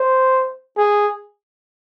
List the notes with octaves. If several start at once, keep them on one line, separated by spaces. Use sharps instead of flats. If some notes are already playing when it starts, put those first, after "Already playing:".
Already playing: C5
G#4